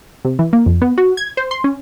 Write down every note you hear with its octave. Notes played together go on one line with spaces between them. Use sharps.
C3
E3
A#3
F2
B3
F#4
G#6
C5
C6
C#4